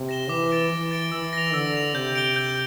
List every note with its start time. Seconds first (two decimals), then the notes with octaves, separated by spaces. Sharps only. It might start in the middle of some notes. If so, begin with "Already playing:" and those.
Already playing: C3
0.09 A#6 E7 G7
0.29 E3 D6
0.50 A6 D7 G7
0.71 E3 D6
0.91 A6 D7 G7
1.12 E3 E6
1.33 A#6 F7
1.54 D3 E6
1.74 A#6 F7
1.94 C3 G6
2.15 D7 G7
2.36 G6